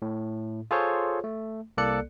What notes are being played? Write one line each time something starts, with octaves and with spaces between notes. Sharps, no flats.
A2
F4 G#4 A4 C5 C#5
A3
C2 A#3 A4 D5 F#6 C#7